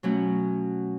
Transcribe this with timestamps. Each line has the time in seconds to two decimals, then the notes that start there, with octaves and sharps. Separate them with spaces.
0.03 B2 F#3 A3 C#4 F#4